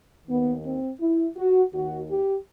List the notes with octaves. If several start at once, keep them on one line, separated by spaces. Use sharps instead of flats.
D#2 D#3 B3
C4
E4
F#4
D#2 D#3 F#4
G4